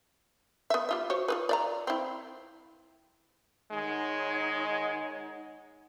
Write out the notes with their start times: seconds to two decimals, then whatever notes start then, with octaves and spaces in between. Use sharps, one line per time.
0.70 B3 E5
0.89 G3 F4 E5
1.10 F#4 C5 C#5
1.28 F4 G#4 B4
1.49 D5 E5 A#5
1.87 C4 E4
3.70 D#3 G#3 D#4 C#5 F#5